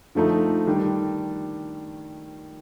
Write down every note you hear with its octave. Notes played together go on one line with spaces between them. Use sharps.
D3 F3 A3 D#4
D#3 G3 D4